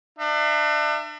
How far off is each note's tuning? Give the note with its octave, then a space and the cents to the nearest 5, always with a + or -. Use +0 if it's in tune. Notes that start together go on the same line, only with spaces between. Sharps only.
D4 +40 E5 +30